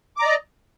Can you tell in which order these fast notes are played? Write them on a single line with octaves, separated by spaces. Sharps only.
D6 A#5 D5 D#5